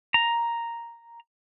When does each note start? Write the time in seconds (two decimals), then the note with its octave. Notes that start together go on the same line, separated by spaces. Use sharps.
0.14 A#5